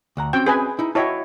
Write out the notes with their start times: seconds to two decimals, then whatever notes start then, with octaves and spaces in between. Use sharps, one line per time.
0.17 D2 F#5 A#5
0.33 C4 C#4 F#4 G5
0.46 G#4 B4 G#5
0.79 D#4 E4
0.95 E4 F#4 C#5 D#5 G5 A5